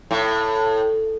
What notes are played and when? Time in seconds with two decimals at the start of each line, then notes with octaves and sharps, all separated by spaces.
0.11 A2